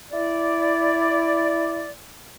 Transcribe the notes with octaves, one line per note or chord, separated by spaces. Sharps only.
E4 D5